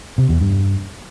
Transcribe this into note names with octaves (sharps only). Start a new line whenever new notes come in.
C3
E2
G2